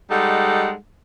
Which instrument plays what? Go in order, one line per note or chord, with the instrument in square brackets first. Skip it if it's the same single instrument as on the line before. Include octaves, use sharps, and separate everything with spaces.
[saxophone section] G3 G#3 D#4 A4 F#5